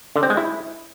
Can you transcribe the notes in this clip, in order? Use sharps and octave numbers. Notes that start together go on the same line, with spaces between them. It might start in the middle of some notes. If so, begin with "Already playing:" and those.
D3
C4
G#3
E4